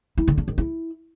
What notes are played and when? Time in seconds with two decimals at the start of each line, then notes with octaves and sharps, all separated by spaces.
0.18 E4
0.28 D3
0.38 D4
0.48 D#3
0.58 E4